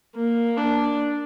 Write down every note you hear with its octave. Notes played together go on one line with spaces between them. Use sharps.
A#3
D4